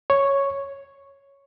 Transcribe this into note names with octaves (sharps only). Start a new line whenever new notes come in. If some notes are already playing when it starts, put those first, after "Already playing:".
C#5